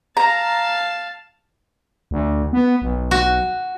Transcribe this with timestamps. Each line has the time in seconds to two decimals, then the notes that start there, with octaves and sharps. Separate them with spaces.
0.17 F5 A5 A#5
2.11 D2
2.53 B3
2.82 B1
3.11 F#4